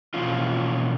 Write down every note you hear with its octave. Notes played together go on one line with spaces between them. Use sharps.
B2 E3 F3 A#3 C#4 F4